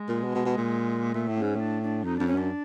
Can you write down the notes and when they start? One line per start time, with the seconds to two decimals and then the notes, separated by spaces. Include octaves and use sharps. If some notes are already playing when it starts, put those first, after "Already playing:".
Already playing: G#3
0.09 A#2
0.23 B2
0.35 B2
0.46 B2
0.57 A#2
1.14 A#2 A3
1.28 A2
1.37 G#2 C#4
1.56 A2 D4
1.82 D4
2.04 F2 D#4
2.16 F2 D4
2.26 C#4
2.34 F#2 D4